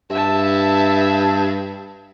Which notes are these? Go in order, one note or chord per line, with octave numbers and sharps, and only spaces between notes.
G2 E5 A5